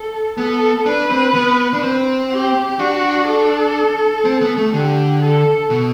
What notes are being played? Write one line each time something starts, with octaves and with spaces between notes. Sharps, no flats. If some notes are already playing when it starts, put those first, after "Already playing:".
Already playing: A4
B3 A4
D4 B4
C4
B3
D4
C4
G4
D4 F#4
A4
C4
B3
A3
D3 G4
A4
B2